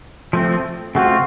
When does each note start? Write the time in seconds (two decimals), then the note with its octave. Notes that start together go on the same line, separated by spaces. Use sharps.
0.33 F3 A3 C4
0.95 C#3 A3 C4 F4 F#4